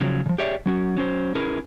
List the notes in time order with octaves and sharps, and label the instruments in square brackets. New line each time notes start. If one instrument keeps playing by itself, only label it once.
[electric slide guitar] C#3 F3 F#3
C#3 F3
G4 G#4 C#5 D5 E5
F#3 C#4 F#4
F#3 C#4 C5
C#4 E4 G#4 A#4 B4